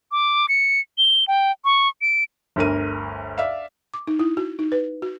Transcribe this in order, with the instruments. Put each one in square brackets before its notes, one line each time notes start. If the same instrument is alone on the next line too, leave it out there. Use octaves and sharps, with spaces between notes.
[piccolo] D6
C#7
G7
G5
C#6
D7
[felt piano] G1 D2 A#4 D#7
D5 E5 F5
[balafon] D6
D#4
E4
F#4
D#4
B4
F#4